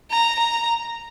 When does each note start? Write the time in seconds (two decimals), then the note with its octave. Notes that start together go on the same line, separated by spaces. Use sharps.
0.11 A#5
0.40 A#5